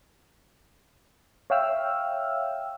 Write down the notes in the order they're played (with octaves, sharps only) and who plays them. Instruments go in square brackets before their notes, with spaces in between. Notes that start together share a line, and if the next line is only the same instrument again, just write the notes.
[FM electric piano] C#5 E5 F5 G5 E6 F6